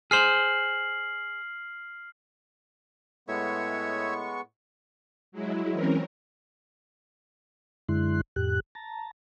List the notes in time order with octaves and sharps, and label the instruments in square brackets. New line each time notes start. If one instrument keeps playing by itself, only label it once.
[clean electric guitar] G#4 C5 [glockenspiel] F6 C7 F#7
[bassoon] A2 [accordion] G#3 B3 C#6 [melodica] C#5 E5
[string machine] F#3 G#3 E4
E3 C4 C#4 A#4
[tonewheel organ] F#2 D3 G#3 E4 C6 F#6
F2 A2 G4 F#6
A5 A#5